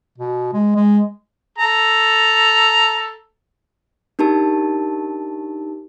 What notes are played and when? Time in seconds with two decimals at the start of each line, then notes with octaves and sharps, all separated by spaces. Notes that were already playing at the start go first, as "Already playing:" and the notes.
0.18 B2
0.53 G#3
0.76 G#3
1.58 A4 A#5
4.19 D4 D#4 G4 A#4 A5